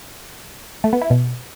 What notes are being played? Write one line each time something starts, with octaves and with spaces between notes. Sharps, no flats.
A3
B3
E4
B2